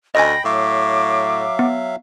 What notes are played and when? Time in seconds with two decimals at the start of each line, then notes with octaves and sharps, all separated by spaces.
0.15 D2 D#5 G5 G#5 B5 A#6
0.45 A2 F#3 E5 F5 D6
1.59 B3